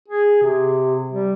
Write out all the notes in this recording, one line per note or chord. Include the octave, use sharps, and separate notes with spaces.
G#4
C3
G3